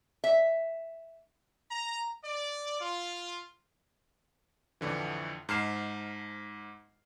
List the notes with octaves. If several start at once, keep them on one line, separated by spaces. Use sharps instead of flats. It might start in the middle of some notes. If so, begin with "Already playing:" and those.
E5
A#5
D5
F4
F2 A2 D3 E3
G#2 A5 F6 C7 E7